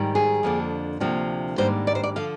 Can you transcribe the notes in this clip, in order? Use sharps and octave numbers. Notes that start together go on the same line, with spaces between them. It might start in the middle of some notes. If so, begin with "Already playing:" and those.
Already playing: G#2 D#3 G3
G#4
F2 D3 F3 A#3 D4
D2 C3 F3 A#3 D4
G#2 D#3 G3 A#3 D4 C5
D5
C5
D5
D3 F3 F5